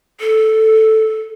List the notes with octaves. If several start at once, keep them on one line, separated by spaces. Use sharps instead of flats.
A4